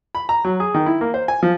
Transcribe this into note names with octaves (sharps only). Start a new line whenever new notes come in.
B5
A#5
F#3
G#4
D#3
E4
A#3
C5
G#5
F3